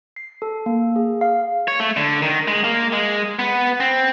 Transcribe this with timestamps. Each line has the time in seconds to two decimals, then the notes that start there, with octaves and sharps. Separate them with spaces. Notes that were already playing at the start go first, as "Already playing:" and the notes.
0.16 C7
0.42 A4
0.66 A#3
0.96 G#4
1.21 F5
1.68 C#5
1.80 A3
1.97 D3
2.22 D#3
2.48 G#3
2.64 A#3
2.93 G#3
3.39 B3
3.80 C4